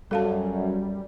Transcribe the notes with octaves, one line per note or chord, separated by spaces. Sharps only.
F#2 G3 A4 F5 A5